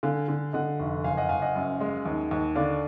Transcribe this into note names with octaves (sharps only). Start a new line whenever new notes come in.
D3 F5 G#5
D3
D3 D#5 F#5
F1
F#1 F5 G#5
D#5 F#5
F#1 F5 G#5
D#5 F#5
F#2
G#3
D#2
D#2
D3 D5 F5